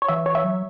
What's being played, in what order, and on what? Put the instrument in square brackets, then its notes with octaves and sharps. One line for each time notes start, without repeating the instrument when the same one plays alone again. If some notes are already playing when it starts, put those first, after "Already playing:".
[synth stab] C#5
[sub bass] E3 [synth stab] E5
[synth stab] C#5
E5
[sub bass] F#3